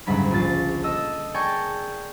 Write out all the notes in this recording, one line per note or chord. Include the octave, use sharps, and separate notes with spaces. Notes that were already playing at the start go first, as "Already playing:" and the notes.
F#1 D2 G#2 G3 B5 B6
A#1 F4 A6
A4 D#5 E6
G#4 A#4 D5 G5 A5 C#6